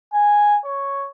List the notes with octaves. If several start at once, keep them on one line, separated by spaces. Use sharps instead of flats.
G#5
C#5